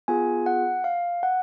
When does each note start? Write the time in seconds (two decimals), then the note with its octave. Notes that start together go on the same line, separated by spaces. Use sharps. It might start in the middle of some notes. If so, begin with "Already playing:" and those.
0.08 B3 F4 G#4 G#5
0.46 F#5
0.84 F5
1.23 F#5